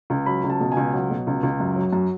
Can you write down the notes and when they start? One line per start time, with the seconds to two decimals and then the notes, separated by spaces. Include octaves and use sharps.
0.10 C#2
0.26 F#3 B5
0.44 C#2
0.49 A5
0.60 B2
0.72 C#2 G#5
0.93 F#3 F#5
1.10 B2
1.27 C#2
1.43 C#2
1.60 F#2
1.76 F#3
1.93 F#2